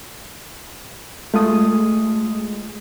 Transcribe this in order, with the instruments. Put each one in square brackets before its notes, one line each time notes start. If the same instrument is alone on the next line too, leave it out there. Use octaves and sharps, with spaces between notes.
[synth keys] G#3 [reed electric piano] A3 F4 D#6